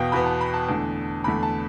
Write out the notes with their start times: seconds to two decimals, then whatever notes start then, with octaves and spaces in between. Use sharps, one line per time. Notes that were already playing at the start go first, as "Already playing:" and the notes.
Already playing: E2 B2 B3 F5 G5
0.12 E2 B2 B3 B5
0.26 A5
0.41 B5
0.54 A5
0.68 E2 D3 A3
1.24 E2 D3 A3 B5
1.43 A5